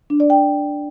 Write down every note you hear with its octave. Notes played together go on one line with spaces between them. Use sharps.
D4
D5
G5